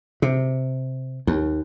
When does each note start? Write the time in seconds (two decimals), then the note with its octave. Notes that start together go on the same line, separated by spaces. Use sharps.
0.22 C3
1.27 D#2